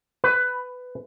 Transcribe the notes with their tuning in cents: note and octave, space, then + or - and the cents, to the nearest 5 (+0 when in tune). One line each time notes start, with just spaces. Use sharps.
B4 +15